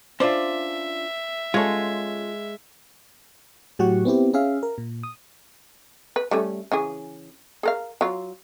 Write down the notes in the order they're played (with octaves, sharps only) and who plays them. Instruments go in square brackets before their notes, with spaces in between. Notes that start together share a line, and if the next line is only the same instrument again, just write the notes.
[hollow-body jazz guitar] C#4 D4 F4 [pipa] C5 D5 [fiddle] E5
[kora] G#3 [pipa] C#4 C#5 [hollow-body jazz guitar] F4 A4
[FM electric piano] A2 F#3 F#4 G4 F#5 C#6
B3 C4 E4 G4
C#4 G#4 E5 F5
A#4
A#2
D#6
[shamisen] B4
G3 A3 C#4
C#3 E3 G#4
G#4 A#4 F5
F#3 F4